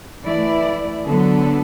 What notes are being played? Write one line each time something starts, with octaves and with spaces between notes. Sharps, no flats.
E3 A3 E4 D5
D3 F#3 B3 D4 A4